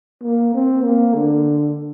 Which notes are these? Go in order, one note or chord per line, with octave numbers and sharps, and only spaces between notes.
A#3
C4
A#3
D3